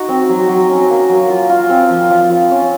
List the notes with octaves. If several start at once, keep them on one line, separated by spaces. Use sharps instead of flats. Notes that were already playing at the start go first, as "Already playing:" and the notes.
Already playing: D#4 F#4
C4
F#3
F#3
C#4
A#3
F#3
F4
F4
C4
F3
F3
F4
C#4